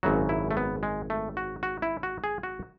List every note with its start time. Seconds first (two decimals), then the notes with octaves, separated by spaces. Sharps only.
0.03 G#1 F#2 C#3 F#3 F#4
0.29 E4
0.51 A3
0.57 B3
0.83 G#3
1.10 A3
1.37 F#4
1.63 F#4
1.82 E4
2.03 F#4
2.24 G#4
2.43 F#4